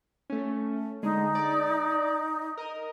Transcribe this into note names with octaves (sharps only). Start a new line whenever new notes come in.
A3 C#4
D3 G#3 D#4
D5
A#4 D#5